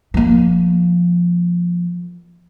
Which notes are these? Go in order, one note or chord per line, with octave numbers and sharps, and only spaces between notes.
F3 A#3